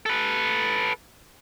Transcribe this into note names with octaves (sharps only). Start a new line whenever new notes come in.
A4 B4